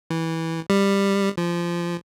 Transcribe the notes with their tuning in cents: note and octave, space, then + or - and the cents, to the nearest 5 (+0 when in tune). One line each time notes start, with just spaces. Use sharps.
E3 -15
G3 +15
F3 -20